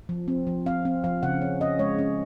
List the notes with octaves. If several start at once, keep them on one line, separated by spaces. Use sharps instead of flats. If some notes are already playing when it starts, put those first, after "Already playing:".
F3
C4
F3
C4 F5
C4
F3 F5
C#3 F#5
C#4
C#4 D#5
G#3 C#5
C#4